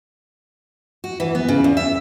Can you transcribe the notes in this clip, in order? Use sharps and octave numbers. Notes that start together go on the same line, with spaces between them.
F#4
E3
B3
C#3
E2
E5